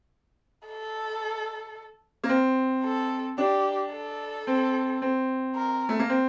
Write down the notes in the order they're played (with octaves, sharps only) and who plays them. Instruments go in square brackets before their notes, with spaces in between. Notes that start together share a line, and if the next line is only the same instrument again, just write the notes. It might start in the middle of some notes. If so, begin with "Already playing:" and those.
[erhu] A4
[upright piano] A#3
C4
[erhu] A4
[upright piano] D4 [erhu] G4
[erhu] A4
[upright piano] C4
C4
[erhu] A#4
[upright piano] A3
A#3
C4